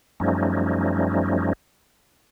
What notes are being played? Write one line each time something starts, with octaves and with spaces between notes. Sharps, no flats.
F#2 F3 G3 A3 C#4 D#4